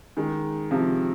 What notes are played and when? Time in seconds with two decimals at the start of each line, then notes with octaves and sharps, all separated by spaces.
0.16 D#3 G#3
0.71 C3 F3